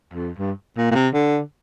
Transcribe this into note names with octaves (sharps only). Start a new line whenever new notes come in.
F2
G2
A#2
A#2
C3
D3